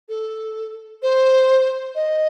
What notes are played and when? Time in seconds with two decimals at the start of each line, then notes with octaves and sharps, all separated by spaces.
0.09 A4
1.03 C5
1.95 D#5